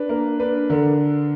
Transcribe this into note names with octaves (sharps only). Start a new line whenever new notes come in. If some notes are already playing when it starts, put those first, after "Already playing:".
Already playing: D4 B4
A#3 A#4
D4 B4
D3 A#4